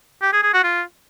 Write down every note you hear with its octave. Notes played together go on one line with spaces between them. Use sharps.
G4
G#4
G#4
F#4
F4